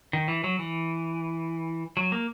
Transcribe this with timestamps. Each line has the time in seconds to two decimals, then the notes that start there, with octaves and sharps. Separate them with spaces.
0.13 D#3
0.28 E3
0.44 F#3
0.59 E3
1.97 F#3
2.12 A#3